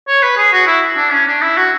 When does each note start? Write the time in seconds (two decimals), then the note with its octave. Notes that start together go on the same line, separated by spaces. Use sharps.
0.08 C#5
0.23 B4
0.37 G#4
0.53 F#4
0.67 E4
0.97 D4
1.12 C#4
1.28 D4
1.42 E4
1.57 F#4